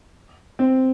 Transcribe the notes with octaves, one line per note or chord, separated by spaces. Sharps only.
C4